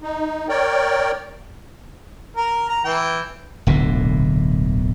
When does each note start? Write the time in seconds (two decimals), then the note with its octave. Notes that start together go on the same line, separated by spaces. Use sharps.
0.02 D#4
0.49 A#4 C#5 D5 G5
2.37 A#4 A#5
2.69 A#5
2.84 E3 G5
3.67 D1 B1 A#2 D3